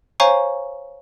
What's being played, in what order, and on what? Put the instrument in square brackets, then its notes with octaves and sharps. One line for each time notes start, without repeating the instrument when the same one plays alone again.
[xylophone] C5 C#5 F5 G#5 A#5 C#6